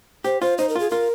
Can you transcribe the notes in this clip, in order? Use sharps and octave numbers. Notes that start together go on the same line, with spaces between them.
G4 C5
F4 C5
D#4 C5
A#4
F4 G#4
F4 A#4